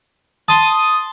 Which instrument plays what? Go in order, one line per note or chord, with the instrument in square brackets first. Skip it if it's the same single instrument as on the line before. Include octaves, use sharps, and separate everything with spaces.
[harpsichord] A5 C6 [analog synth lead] D#6